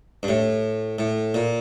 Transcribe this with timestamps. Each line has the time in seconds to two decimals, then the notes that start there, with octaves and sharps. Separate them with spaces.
0.23 G2
0.28 A2
0.99 A2
1.34 A#2